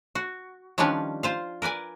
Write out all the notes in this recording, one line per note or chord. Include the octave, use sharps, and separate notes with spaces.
F#4
D#3 F3 G3 C#4 D4 B4
F4 C5 F5
A#4 B4 D5 G#5